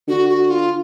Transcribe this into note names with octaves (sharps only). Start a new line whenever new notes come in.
D3 F#4
F#4
F4